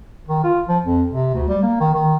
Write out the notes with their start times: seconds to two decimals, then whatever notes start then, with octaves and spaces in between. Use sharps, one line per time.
0.28 D#3
0.44 F4
0.68 F3
0.84 F2
1.11 C3
1.34 D2
1.49 G3
1.63 A#3
1.80 D#3
1.94 D#3